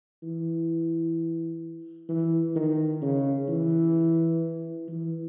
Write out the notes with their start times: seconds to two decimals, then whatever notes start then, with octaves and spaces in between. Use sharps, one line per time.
0.23 E3
2.09 E3
2.55 D#3
3.02 C#3
3.49 E3
4.88 E3